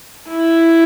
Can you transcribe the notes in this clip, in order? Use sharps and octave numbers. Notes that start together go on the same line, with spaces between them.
E4